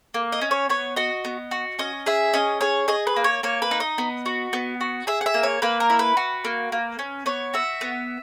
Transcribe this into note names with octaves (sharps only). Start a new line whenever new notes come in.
A#3
D#5
C#4
C#5
B3 C#5
F#4 D#5
B3
F#4
C#4 D#5
G#4 E5
C#4 D#5
G#4 C#5
G#4 D#5
B4
A#3
C#5
A#3 C#5
B4
D#4
D#5
B3
F#4
B3
F#4
G#4 E5
F#5
E5
A#3
C#5
A#3 B4
A#4
E4
B4
F#4
A#3
A#3
C#4
B3 C#5
F#4 E5
B3